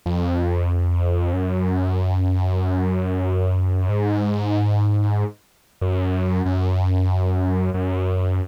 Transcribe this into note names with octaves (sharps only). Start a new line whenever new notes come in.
F2
F#2
G#2
F#2
F#2
F#2